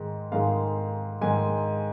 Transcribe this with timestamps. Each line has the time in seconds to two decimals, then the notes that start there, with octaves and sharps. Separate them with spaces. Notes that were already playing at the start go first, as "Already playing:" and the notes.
Already playing: G#2 D#3 G#3
0.32 G#2 D#3 G#3 F5
1.21 G#2 D#3 G#3 G#5